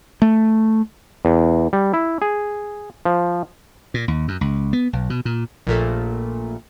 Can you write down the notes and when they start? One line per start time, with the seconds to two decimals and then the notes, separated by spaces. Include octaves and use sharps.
0.22 A3
1.25 E2
1.73 G3
1.94 E4
2.22 G#4
3.05 F3
3.94 A#2
4.08 D#2
4.28 F#2
4.41 C#2
4.73 B3
4.93 B1
5.10 B2
5.25 A#2
5.67 A#1 A#2 A3